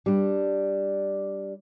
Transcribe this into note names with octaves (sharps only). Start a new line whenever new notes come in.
G3 D4